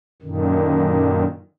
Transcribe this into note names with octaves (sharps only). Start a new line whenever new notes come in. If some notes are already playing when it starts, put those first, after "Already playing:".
F#2 A#2 D3 D#3